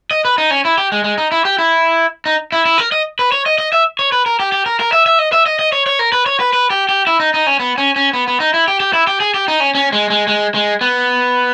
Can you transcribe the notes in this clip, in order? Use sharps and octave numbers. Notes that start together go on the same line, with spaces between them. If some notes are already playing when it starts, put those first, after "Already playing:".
D#5
B4
D#4
C#4
E4
G4
G#3
G#3
D#4
E4
G4
E4
D#4
E4
E4
A#4
D#5
B4
C#5
D#5
D#5
E5
C#5
B4
A#4
G4
G4
A#4
A#4
E5
E5
D#5
E5
D#5
D#5
C#5
C#5
A#4
B4
C#5
B4
B4
G4
G4
E4
D#4
D#4
C#4
B3
C#4
C#4
B3
B3
D#4
E4
G4
G4
E4
G4
G#4
G4
D#4
C#4
C#4
G#3
G#3
G#3
G#3
B3